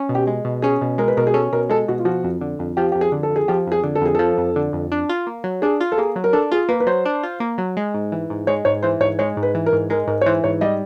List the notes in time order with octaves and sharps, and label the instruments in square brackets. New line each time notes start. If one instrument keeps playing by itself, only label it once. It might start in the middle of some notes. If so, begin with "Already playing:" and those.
Already playing: [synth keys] C#4
B2
[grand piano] G4
[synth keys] G#3
B2
[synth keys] C#4 [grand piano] G#4
[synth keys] B2
[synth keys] G#3 [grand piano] A#4
[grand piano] B4
[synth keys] B2 [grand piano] A#4
[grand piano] G#4
[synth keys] C#4 [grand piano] A4
[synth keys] B2 [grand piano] A#4
[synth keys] G#3 [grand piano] A4
[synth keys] B2 [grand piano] F#4
[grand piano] F4
[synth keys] F3 [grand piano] F#4
[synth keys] F2
D3
F2
[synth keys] F3 [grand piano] G4
[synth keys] F2 [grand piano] G4
[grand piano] G#4
[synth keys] D3
[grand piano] A4
[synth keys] F2
[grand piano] G#4
[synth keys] F3 [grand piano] G4
[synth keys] F2 [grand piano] G#4
[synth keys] D3
[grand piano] A4
[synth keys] F2 [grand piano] G#4
[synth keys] F3 [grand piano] A4
[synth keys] F2
D3
F2
D4
F4
A#3
F#3
[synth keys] D4 [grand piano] G#4
[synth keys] F4
[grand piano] A4
[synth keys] A#3 [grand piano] G#4
[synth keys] F#3
[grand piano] A#4
[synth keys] D4 [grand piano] A4
[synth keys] F4 [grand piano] G#4
[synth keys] A#3 [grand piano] B4
[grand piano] B4
[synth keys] F#3 [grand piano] C5
[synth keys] D4
F4
A#3
F#3
G#3
G#2
E3
G#2
[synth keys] G#3 [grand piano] C#5
[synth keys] G#2 [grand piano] C#5
[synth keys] E3 [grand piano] C5
[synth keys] G#2 [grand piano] C#5
[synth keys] G#3 [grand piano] C#5
[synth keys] G#2
[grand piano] B4
[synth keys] E3
[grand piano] A#4
[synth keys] G#2
[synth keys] G#3 [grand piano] A#4
[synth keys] G#2 [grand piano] A#4
[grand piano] C#5
[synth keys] E3 [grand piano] C5
[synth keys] G#2 [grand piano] C#5
[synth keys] G3 [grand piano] D#5